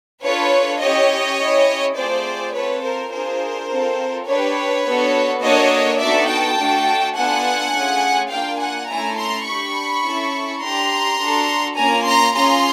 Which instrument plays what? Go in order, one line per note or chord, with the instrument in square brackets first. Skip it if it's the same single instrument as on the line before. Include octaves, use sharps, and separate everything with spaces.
[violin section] D4 F4 A4 B4 C#5
C#4 E4 G4 C#5 D#5
C#4 E4 G4
A3 C4 F4 G#4 C5 D5
C4 F4 A4 B4 C#5
A#4 C5
D4 F4 G#4 A#4 C5
C4 F4 A4
D4 G4 B4 C#5
B3 D4 F#4 A4
A#3 D4 F#4 A4 C#5 D#5
B3 D#4 F#4 A4 D5 E5
G5 A5
A3 D4 F#4 A4
B3 D4 F4 A4 F#5 G#5
A3 C#4 F4 G#4
A#3 D4 F4 F5 G5
F#5 G#5
A3 C#4 E4 A4 G#5 A#5
A#5 C6
D4 G4 B5 C#6
C#4 E4 A4
D4 G4 A#5 C6
D4 F#4 A4
A#3 C#4 F4 G#5 A#5
A#5 C6
C#4 F4 G#4 A#5 C6